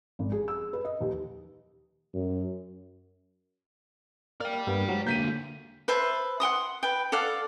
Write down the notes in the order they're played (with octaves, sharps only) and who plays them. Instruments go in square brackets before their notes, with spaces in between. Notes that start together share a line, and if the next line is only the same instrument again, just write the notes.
[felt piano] G#1
G#4
E6
B4
D#5
D#2
[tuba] F#2
[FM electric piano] A#3 [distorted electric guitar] D5 G5 [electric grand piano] F6
[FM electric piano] G2 A#3 B3
G#2 F3 F#3
[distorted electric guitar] D3 A#3 [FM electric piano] A#4 [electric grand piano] G6 B6 D#7
[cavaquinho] B4 C5 E5 A5
F#5 G5 C6 D#6
B4 G5
A4 D5 F5 F#5